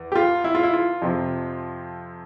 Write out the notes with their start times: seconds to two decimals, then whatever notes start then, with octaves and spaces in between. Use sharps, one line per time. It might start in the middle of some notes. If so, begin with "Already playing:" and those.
Already playing: E2
0.12 G4
0.15 F4
0.44 E4
0.55 F4
0.63 E4
0.73 F4
1.02 F2 C3 F3